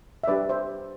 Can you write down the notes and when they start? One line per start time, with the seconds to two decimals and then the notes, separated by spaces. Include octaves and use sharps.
0.24 E5
0.27 G3 D4 G4 B4 D5
0.49 C5 E5